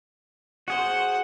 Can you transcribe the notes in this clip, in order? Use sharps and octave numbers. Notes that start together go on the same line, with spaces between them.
F#4 G#4 C5 F#5